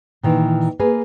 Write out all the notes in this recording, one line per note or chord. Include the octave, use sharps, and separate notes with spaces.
A#2 D#3 E3
A#3 G#4 B4